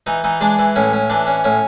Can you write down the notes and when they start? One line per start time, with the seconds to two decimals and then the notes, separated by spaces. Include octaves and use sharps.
0.06 E3 D#4
0.24 E3 D#4
0.41 G#3 D4
0.59 E3
0.76 A2 C#4
0.93 C#4
1.10 E3 D4
1.27 C#4
1.44 A2 C#4